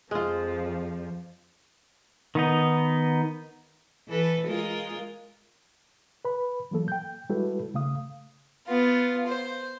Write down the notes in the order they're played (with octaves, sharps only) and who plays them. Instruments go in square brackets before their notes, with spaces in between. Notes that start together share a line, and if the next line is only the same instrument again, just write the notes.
[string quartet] F2 F3 [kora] G#3 F4
[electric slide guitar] D#3 B3 D#4
[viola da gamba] E3 A4 B4
G#3 F4 A#4
[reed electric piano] B4 B5
E3 F#3 A#3 A4
G5 G6
G3 G#3 E4 F#4 A4 B4
C#3 A3 F5 D#6
[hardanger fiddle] B3 F4
C5